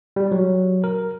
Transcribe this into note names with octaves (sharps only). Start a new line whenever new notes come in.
G3
F#3
A#4